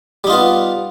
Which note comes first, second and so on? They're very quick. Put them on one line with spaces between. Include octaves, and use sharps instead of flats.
G3 D#4 F4 B3